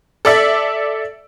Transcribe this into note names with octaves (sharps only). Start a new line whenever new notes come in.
A4 D5 E5